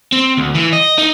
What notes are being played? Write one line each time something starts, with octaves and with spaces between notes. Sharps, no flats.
C4
D2
E3
D#5
D#4